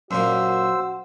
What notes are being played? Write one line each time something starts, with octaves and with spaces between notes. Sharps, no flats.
F#2 A#2 A#3 F#4 C5 E6